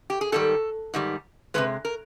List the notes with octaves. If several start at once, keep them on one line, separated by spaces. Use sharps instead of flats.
G4
G#4
G#2 D#3 G3 A4
G#2 D#3 G3
C3 D#3 G#3 B4
A#4